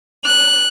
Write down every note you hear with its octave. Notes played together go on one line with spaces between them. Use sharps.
F#6